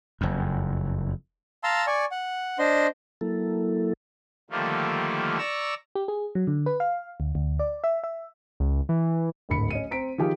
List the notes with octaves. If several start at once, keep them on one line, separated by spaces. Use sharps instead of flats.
F#1 F2
F5 A5 A#5 C6 E6
D5 G#5 C#6
F#5
D4 C5 D#5 C6
F#3 A#3 E4 A4
D3 D#3 F3 G3 A3 A#3
D5 A#5 C#6 E6
G4
G#4
F#3
D3
B4
F5
D2
D2
D5
E5
E5
C#2
E3
D1 G#1 D3 B5 C#7
C#4 D#5 D#7
C4 A#5 B6 D7
D#3 F3 F4 G4 G#4 G5